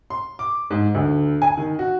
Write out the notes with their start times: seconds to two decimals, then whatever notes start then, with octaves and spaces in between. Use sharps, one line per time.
0.10 C6
0.39 D6
0.71 G#2
0.95 D2
1.42 G#5
1.57 D#3
1.79 F#4